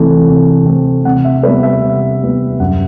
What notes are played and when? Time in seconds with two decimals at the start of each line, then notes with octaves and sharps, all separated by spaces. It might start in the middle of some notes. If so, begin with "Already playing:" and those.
Already playing: C3 E3 A3 C4
0.28 C3
0.65 E3 A3 C4
1.05 C3 F#5
1.24 E5
1.43 G3 B3 B4
1.63 E5
1.82 C3
2.21 G3 B3
2.59 F#2 F#5